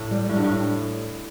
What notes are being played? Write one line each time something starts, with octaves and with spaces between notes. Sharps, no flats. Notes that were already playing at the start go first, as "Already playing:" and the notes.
Already playing: A2
G3
A2 G3
G2
A2